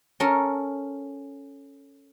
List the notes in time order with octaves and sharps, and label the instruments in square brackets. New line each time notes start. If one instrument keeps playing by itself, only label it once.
[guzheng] C#4 A4 A#4